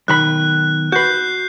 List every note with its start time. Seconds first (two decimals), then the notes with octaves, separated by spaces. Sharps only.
0.08 B1 D#3 B5 F#6
0.92 F#4 B4 G6 C7